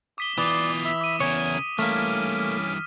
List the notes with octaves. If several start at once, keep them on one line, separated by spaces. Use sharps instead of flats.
D6 D#6 B6 G7
B2 E3 F4 D5 D#6
E5 B5
D6 D#7
E2 C#3 A#4 C#5 G#5
G2 E3 A3 A#3 C#4 D6 F6 B6